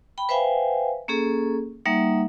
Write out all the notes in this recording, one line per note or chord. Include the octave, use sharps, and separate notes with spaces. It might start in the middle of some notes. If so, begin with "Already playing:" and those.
G5 B5
B4 C5 E5 F5 G5 G#5
A#3 C#4 G#4 A4
G3 A#3 D#4 E5 F#5